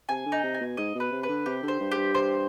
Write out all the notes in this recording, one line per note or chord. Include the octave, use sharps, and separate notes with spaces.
C3 G#5
D3
D#4
C3
G#5
B2
G#2 D#5
B2
B4
C3
B4
D3
C3 G4
D3
C5
G2
G4
G2
C5